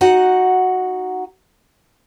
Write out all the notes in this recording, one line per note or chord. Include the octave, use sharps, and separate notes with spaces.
D#4 F#4 F#5